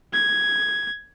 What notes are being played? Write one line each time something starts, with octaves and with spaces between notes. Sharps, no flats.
G#6